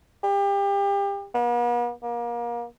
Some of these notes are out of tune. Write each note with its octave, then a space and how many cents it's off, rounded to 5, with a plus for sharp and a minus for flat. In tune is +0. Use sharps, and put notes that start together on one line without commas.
G4 +30
B3 -45
A#3 +30